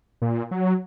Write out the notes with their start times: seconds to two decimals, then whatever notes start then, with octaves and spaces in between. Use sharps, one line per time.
0.22 A#2
0.51 F#3